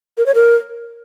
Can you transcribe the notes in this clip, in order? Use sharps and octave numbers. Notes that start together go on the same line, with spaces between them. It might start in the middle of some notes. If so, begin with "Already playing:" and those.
A#4
C#5
A#4